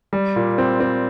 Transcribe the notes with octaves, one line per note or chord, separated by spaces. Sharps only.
G3
A#2
C4
C4